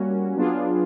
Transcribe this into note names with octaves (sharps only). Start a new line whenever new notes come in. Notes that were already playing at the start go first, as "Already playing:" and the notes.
Already playing: G3 A#3 C#4 F#4
F#3 B3 D4 F4 G#4